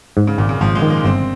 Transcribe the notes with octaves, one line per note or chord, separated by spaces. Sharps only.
G#2
C#3
G#1 A#2
C#3
G#1 F3
G#3
D#3
A#3
G1 C4